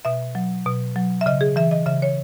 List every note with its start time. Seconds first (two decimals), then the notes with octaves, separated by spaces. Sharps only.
0.05 B2 E5
0.35 F#3
0.66 B2
0.96 F#3
1.21 E5
1.26 C#3 D#5
1.41 G#4
1.56 E3 E5
1.71 D#5
1.86 C#3 E5
2.02 C#5